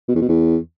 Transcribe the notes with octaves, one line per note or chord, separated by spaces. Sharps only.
B2
E2
B2
E2